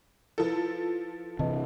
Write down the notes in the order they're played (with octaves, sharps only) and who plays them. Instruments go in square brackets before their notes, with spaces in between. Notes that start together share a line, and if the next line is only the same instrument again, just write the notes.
[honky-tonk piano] F3 A4 [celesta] E4 F4 B4
[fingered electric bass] C3 E3 [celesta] B4 D#5 A5